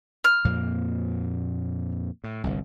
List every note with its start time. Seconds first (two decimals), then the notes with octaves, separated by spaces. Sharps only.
0.24 F6
0.45 F2 A#2 A#3
2.24 A2
2.44 G1 C2